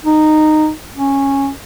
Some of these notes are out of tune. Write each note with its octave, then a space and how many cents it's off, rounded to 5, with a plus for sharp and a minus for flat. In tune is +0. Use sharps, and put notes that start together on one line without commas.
D#4 -10
C#4 -10